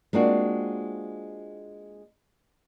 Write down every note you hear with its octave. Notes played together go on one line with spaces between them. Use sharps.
G#3 A#3 C4 D4 F4 F#4